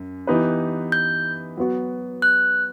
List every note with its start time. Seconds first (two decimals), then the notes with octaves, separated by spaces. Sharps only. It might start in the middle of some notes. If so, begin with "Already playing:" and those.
Already playing: F#2
0.27 E3 B3 D#4 G4 B4
0.92 G6
1.57 F#3 B3 F#4
2.22 F#6